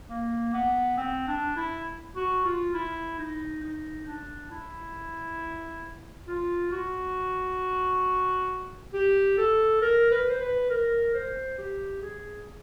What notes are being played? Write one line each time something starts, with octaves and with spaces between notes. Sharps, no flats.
A#3
B3
C4
D4
E4
F#4
F4
E4
D#4
D#4
D4
E4
F4
F#4
G4
A4
A#4
B4
C5
B4
A#4
C5
G4
G#4